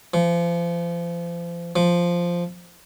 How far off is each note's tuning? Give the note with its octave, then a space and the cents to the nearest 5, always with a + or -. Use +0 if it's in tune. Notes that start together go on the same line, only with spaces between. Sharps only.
F3 -35
F3 -5